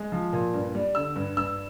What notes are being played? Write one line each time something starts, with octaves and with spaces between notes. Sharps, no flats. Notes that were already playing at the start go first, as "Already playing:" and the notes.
Already playing: G#3
F3
A#2
G2
G3
D3 E6
G2
G2 E6